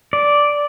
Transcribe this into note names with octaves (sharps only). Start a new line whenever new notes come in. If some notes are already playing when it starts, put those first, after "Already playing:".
D5